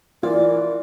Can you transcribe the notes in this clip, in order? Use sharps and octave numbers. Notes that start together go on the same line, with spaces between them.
E3 F4 A#4 D5